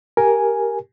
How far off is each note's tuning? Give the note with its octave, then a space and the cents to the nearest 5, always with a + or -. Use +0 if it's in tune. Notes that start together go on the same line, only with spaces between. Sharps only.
G4 +0 A#4 +0 G#5 +0